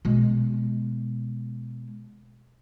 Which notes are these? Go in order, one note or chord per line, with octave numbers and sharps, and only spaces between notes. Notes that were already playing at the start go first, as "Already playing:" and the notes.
B2 G#3